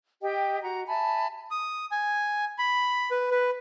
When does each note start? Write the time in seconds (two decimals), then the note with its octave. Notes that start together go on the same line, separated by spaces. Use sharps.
0.22 G4 D#5 G5
0.62 F#4 A#5
0.87 E5 G#5 A5 B5
1.51 D#6
1.92 G#5
2.59 B5
3.11 B4
3.31 B4